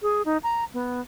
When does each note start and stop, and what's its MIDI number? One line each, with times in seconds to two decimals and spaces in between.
0.02 0.22 68
0.25 0.38 63
0.43 0.65 82
0.74 1.01 59